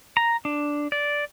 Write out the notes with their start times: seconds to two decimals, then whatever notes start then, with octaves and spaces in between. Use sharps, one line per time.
0.17 A#5
0.45 D4
0.92 D5